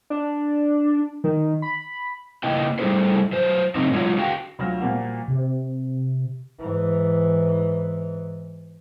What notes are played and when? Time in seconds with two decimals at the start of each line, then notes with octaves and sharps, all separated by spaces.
0.10 D4
1.24 D#3
1.62 B5
2.43 C#3 A#3 E4 D#5 G5
2.79 G3 A3 B3 E4 G#4 C5
3.32 F#3 C5
3.75 F#2 A2 C#3 C4 D#4
3.92 D3 F#3 G#3 C#4 F4 C#5
4.18 F#4 G#4 F5 G5
4.59 D2 F#3 F4 F6 A#6
4.81 A#2 F3 G3 A#3 F#4
5.28 C3
6.59 G#2 E3